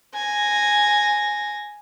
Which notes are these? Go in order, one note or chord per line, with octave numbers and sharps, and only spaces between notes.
G#5 A#6